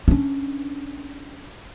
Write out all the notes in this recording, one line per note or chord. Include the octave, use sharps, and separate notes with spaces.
C#4 D4